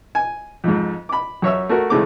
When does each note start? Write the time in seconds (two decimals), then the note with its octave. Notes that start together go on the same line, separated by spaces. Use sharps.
0.15 G#5
0.64 F2 G#2
1.09 B5 D6
1.42 F#2 C#5 E5 E6
1.69 A3 F#4 A#4
1.90 C#3 E3 G#3 A3 C4 D6